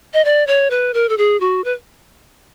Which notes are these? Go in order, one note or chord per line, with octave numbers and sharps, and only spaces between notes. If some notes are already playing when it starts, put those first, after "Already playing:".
D#5
D5
C#5
B4
A#4
A4
G#4
F#4
B4